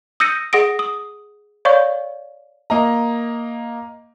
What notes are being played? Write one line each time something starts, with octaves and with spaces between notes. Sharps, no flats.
D#6 E6 G6 A#6 C#7 D#7
G#4 F#5 D#6 A#6 D7
D#6
C#5 D5 F5 C#6 G6
A#3 D#5 A#5